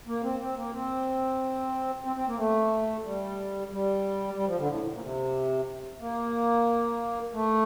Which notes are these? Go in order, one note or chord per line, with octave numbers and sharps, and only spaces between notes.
A#3
C4
C4
A#3
C4
C4
C4
A#3
A3
G3
G3
G3
F3
D3
A2
A#2
A#2
C3
A#3
A3